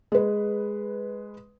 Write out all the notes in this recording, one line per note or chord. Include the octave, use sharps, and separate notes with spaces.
G#3 B4